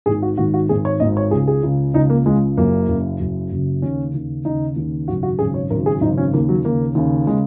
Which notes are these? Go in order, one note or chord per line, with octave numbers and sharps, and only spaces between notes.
G#1 G#2 D#3 G#4
F#4
G#1 G#2 D#3 F#4
F#4
G#1 G#2 D#3 G#4
C#5
G#1 G#2 D#3 D#5
C#5
C#2 C#3 G#4
G#4
C#2 C#3
C#2 C#3 D#4
A#3
C#2 C#3 G#3
F#1 F#2 C#3 A#3
F#1 F#2 C#3
F#1 F#2 C#3
F#1 F#2 C#3
D#2 C#3 C#4
D#2 C#3
D#2 C#3 D#4
D#2 C#3
G#1 F#2 C#3 F#4
F#4
G#1 F#2 C#3 G#4
C#5
G#1 F#2 C#3 A#4
G#4
G#1 F#2 C#3 D#4
C#4
D#2 C#3 A#3
F#3
D#2 C#3 A#3
D#2 C#3
C#3 G#3